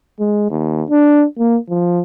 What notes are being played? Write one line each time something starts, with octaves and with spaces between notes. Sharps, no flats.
G#3
D#2
D4
A#3
F3